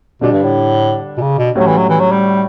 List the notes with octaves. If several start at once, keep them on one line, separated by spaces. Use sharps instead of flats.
B2 D3 G3 D4
G2
A2
B2
C#3
B2
A2 F#3 G3 C#4 F#4
E3
F#3
E3
F#3
G3